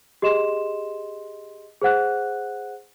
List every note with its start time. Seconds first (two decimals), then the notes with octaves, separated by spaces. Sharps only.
0.22 G4 G#4 D#5 C6 E7
1.82 G#4 C5 F#5 F#6